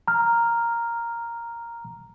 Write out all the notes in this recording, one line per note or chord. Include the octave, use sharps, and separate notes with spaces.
A#5 F6